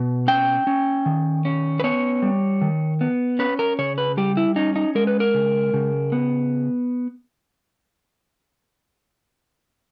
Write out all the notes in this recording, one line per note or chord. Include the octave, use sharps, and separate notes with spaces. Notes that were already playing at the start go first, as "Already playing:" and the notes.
Already playing: B2
C#4 G5
C#4
D#3
C#4
B4
B3 C#5
G3
D#3
B3
C#4 B4
A#4
C#3 C#5
B4
G3 G4
E4
C#4 D#4
D#4
G#3 A#4
B4
A#4
C#3
C#3
B3